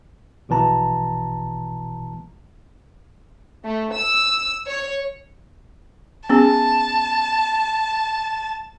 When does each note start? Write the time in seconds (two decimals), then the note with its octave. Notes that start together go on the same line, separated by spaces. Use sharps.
0.49 A#1 B2 E3 A5 A#5
3.65 A3
3.94 E6
4.67 C#5
6.30 B3 C#4 G#4 A5